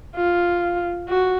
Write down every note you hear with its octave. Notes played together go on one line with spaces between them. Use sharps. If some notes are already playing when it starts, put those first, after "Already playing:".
F4
F#4